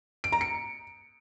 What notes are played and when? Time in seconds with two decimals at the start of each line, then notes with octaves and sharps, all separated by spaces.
0.24 D7
0.32 A#5
0.41 C#7